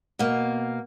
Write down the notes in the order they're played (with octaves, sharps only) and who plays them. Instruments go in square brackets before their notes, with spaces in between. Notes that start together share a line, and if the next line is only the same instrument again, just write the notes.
[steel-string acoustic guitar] B2 A#3